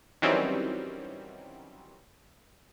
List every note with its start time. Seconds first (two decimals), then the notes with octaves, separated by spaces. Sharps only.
0.22 D#3 E3 F#3 G3 C4 C#4